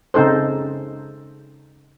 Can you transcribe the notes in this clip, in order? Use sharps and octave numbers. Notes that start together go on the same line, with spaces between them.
C#3 C4 D#4 A4 C5